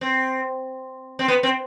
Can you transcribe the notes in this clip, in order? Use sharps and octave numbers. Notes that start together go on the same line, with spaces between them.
C4
C4
B3
C4